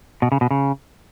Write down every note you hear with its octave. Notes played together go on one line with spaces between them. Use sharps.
B2
C#3
B2
C#3